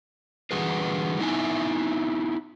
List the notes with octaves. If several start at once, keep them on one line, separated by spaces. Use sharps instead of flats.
D3 E3 G3 F#4 G#4 B4
B3 D#4 E4 E5 G#5